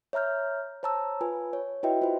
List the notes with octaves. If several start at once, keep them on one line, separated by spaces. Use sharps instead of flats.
C#5 E5 A#5 F6 G6
C5 C#5 A5 A#5 E6
F4 B4 G#5
C#5
E4 F#4 B4 D#5 E5 G5
F4 C5